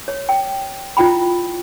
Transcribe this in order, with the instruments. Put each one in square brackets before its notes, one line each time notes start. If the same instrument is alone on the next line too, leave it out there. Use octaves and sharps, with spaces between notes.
[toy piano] C#5
G5
E4 F4 G5 B5